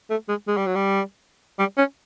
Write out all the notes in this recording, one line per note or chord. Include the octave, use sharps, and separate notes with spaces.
A3
G#3
G#3
G3
F#3
G3
G3
C#4